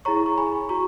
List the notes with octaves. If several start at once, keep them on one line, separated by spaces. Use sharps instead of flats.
E4 G#4 C#5 A#5 C#6
C#6
G#5 B5
F#4 A#5 C#6